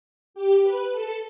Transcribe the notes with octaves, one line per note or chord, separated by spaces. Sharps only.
G4
B4
A4